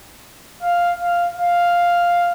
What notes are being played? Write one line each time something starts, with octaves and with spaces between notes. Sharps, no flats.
F5
F5
F5